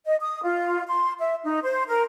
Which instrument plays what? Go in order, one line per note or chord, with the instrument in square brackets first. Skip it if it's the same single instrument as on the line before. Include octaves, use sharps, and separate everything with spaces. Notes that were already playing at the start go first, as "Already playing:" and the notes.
[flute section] D#5
D#6
F4
C6
E5
D#4
C5
A#4